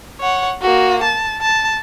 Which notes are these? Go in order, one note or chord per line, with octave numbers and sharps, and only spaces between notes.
C#5 F#5
A#3 F#4
A5
A5